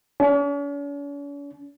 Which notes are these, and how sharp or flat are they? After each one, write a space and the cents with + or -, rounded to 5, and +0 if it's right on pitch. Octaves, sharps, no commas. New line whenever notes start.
C#4 +45